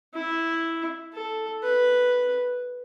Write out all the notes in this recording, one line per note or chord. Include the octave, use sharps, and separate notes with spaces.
E4
A4
B4